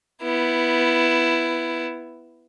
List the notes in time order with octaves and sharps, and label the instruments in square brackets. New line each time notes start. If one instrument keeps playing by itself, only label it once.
[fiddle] B3 E4